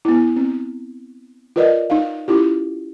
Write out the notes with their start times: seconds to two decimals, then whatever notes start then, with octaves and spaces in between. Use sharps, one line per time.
0.05 B3 E4
0.36 C4
1.56 F4 A#4 B4 D5 D#5
1.90 D#4 F5
2.28 C#4 E4 F4 G4